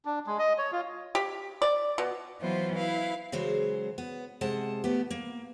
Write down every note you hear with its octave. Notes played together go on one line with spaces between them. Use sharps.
D4
G#3
D#5
C#5
F4
G4
D5
B2
E3 F#3 B3 F4 B4 C5
E4 B4 F5
C#3 E3 F#3 G#3 C5
B3
C3 G#3 F#5 A5
A3 B3 G4
A#3